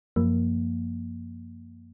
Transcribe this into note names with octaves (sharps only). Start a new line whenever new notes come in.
F#2 F3 A#3